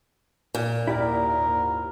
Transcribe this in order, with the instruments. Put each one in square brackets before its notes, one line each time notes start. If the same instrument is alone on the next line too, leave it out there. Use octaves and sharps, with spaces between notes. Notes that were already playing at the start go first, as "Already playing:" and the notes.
[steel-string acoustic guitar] A#2
[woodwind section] D#2 G#2 [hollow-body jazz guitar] E4 G4 D5 [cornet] A#4